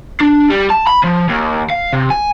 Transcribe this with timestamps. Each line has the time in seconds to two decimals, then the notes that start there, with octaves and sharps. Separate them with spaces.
0.21 D4
0.50 G3
0.70 A5
0.87 B5
1.03 F3
1.29 D#2
1.70 F5
1.93 C3
2.10 G#5